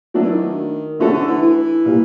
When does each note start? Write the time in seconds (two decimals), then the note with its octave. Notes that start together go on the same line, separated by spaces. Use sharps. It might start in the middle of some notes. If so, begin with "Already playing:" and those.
0.14 D#3 F#3 A3 D4
0.22 E3
0.31 D#3
0.99 D3 F3 A3 C#4 F#4 A4
1.13 D3
1.28 E3
1.42 E3
1.85 A#2 G3 A#3